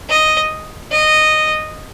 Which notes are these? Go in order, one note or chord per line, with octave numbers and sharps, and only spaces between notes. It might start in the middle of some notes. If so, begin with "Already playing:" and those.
D#5
D#5